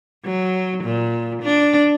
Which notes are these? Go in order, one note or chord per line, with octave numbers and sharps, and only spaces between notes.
F#3
A#2
D4